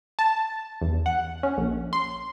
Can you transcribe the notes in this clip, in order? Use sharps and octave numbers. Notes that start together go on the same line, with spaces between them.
A5
E2
F#5
C#4
A#1
C6